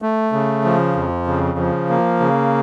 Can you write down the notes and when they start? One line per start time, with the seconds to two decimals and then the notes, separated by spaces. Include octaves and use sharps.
0.02 A3
0.33 C#3
0.64 F3
0.96 F2
1.27 C#3
1.58 F3
1.90 A#3
2.20 C#3